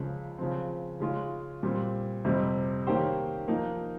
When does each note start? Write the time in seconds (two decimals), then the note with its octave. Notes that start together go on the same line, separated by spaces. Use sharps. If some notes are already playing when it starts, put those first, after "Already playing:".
Already playing: C#2 C#3 F3
0.38 C#3 F3 C4
1.00 C#3 G#3 C#4 F4
1.63 A#2 G3 C4
2.25 F2 C3 G3 C4
2.87 D#3 A#3 C#4 G4 C5
3.48 F3 A#3 D#4